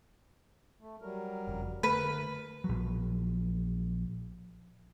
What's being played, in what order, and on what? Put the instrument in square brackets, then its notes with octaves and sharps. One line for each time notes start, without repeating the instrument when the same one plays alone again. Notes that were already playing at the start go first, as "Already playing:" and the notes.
[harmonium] A3
F#3 G3 A#4
[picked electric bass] F#1 F2
[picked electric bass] D3 A3 [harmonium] A#4 [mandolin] B4
[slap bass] A#1 F#3